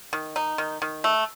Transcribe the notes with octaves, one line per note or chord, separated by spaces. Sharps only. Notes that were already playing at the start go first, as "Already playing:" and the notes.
D#3
D#4
D#3
D#3
A3